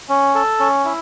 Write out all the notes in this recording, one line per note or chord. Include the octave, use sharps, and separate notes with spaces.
C#4
A4
C#4
E4